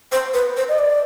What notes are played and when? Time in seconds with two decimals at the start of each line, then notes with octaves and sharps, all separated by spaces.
0.12 C5
0.34 B4
0.57 C5
0.69 D#5
0.79 D5